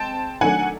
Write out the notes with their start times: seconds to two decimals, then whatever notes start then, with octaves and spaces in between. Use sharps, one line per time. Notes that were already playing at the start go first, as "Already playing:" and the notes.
Already playing: G#3 C4 G5 A5
0.41 D#3 F#3 A3 D4 F#5 G#5